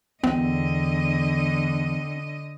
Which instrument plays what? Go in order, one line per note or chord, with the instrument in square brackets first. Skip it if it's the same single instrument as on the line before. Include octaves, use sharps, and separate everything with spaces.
[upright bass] E2 [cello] D3 D#5 [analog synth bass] C4